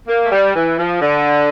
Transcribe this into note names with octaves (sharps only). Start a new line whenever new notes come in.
A#3
A3
G3
E3
F3
D3